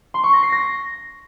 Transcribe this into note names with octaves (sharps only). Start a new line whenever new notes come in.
C6
C#6
A#6
C7
A#6